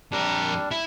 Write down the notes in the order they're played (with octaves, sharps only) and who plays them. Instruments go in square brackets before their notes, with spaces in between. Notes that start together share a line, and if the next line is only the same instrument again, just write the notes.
[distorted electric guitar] F2 A#4 [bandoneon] G3 D4
[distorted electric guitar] E4